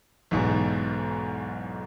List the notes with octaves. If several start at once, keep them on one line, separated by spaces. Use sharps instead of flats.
B1 E2 G#2 B2